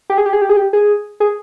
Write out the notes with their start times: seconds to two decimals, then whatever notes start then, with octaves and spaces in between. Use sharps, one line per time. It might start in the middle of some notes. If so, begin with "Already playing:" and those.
0.10 G4
0.18 G#4
0.26 G4
0.33 G#4
0.41 G4
0.49 G#4
0.57 G4
0.73 G#4
1.20 G#4